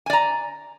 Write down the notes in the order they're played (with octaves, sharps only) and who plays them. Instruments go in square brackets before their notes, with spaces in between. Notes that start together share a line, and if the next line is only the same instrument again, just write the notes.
[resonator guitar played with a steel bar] G#5
D5
A#5